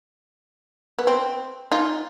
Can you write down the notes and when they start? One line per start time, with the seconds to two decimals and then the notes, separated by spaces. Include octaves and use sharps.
0.99 B3
1.07 C4
1.72 D#4 F4